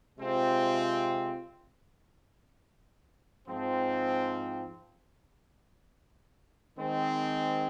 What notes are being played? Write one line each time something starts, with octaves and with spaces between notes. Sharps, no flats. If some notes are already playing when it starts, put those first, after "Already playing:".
C3 G#3 C4 F4
G#2 F3 C4
D#3 G#3 C4